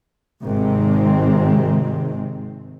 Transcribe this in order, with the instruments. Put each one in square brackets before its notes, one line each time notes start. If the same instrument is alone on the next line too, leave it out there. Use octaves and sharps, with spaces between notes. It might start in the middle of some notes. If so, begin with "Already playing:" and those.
[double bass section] G#1 C3 D#3 G#3 C4